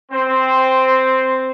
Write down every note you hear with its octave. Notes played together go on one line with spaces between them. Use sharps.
C4 C5